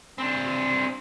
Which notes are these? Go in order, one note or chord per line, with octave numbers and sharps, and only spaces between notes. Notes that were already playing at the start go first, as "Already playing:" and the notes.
C4 D4